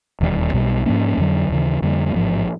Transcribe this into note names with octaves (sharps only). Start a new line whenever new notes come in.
E1 D#2 D3 G3
B1 B2 G3
G#2 F3 A#3 C#4
F2 D3 F#3
D#2 C#3 E3
F2 D3 G3 A#3
A1 G#2 F3